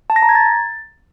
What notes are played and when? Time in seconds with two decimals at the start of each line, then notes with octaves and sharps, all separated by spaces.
0.10 A5
0.16 A#6
0.22 A#5
0.29 G#6
0.35 A6